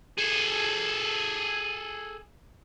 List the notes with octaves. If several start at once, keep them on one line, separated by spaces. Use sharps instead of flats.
G#4 A4